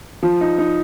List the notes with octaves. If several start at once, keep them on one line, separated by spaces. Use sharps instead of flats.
F3
D#4
D#4